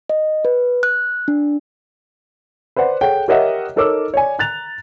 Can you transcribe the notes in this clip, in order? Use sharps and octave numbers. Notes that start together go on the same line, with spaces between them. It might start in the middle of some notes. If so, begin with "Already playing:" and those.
D#5
B4
F#6
D4
B4 C5 D5 F#5
G#4 A4 C#5 F#5 G5
G4 A#4 C#5 D#5 E5 F#5
D#4 A4 A#4 C#5 D6 E6
C#5 D5 G#5
A#5 F#6 A6 F7